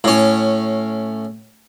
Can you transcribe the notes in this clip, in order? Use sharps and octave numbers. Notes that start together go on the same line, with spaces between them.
A2 C#4